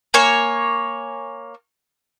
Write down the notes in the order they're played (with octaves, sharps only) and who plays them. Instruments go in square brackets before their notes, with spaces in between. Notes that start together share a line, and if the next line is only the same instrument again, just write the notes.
[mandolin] A#3 C#5 G#5